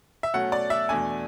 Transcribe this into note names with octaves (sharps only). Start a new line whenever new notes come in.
E5
B2 F#3 A3 C#4 F#5
D5
E5
E2 B2 A3 D4 G#5